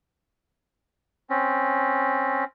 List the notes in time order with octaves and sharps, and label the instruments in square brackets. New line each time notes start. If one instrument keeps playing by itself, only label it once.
[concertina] C4 C#4